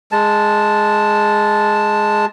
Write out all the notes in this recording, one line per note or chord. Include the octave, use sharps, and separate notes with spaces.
G#3 A5